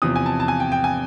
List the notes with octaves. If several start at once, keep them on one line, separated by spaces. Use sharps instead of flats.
E2 C3 F3 D#6
G#5
A5
A5
G#5
G5
G5
G#5